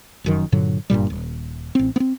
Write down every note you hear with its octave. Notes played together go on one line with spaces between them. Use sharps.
F1 F#2 D#3
G2 A#2 D3 F#3
F#1 G2 A#2 G3
D#1
A1 C4
B3 C4